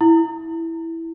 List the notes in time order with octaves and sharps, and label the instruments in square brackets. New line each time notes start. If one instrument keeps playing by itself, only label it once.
[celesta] E4